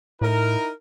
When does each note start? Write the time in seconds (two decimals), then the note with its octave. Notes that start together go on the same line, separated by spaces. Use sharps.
0.21 A2 D#4 E4 A#4